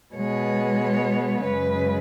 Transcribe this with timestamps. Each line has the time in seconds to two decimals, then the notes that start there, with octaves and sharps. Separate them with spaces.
0.15 B2 G#3 B3 C#5
1.44 F#2 C#3 G#3 B4